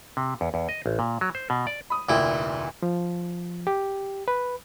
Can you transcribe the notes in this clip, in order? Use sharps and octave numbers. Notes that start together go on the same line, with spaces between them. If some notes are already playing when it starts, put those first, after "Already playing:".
C3
E2
E2
D#5
A1
A#2
F#3
C5
B2
D5
B5 D#6
F1 D2 A#2 E4 G5
F3
G4
B4